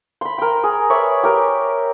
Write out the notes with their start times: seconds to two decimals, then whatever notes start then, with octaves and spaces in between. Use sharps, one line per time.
0.21 B5 C6
0.38 A#4 G5
0.64 G#4
0.90 B4 C#5 D5 E5
1.23 G4 A#4